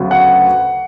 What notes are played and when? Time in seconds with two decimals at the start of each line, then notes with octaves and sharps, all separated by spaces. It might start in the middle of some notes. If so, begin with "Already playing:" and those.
Already playing: D2 C#3 F#3 B3
0.11 F#5